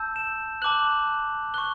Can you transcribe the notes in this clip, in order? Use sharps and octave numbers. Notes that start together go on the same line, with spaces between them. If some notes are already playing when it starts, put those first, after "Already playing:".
Already playing: A5 E6 G6
E7
A5 D6 F#6 F#7
C#6 F#6 G7